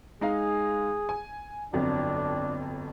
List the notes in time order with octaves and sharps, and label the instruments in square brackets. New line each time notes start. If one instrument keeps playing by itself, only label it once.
[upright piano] G#3 D#4 F5 [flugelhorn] G#4
[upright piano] G#5
[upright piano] G1 F2 F#3 [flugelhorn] D4